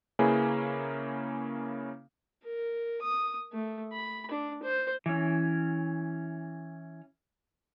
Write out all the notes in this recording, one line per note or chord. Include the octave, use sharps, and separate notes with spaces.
C#3 A#3 C#4 E4 G#4 B4
A#4
D#6
A3
B5
D4
C5
E3 C#4